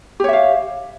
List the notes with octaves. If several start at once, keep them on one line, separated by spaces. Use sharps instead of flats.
G4 C#5 E5 F5